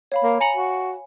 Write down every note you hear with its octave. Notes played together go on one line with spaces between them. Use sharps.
C#5 F5 B5
A#3
G#5 A#5 C#7 F#7
F#4